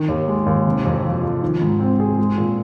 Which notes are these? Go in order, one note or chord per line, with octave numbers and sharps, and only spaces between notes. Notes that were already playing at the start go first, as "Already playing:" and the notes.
Already playing: D#3
D#2
G#3
D#2
C3
F2
F3
F2
D#3
G#2
C4
G#4
G#3
A#2